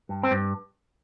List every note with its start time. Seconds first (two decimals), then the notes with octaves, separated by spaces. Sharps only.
0.09 G2
0.23 C4
0.31 G2